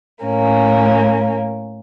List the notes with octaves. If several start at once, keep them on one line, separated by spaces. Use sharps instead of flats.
A2 A#3 C#4